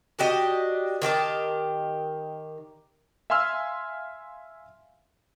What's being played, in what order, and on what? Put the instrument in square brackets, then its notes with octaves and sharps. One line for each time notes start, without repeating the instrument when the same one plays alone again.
[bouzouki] D4 F#4 G4 D#5
D#3 G4 D5 A5
[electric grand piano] E5 F5 G#5 C6 E6 F6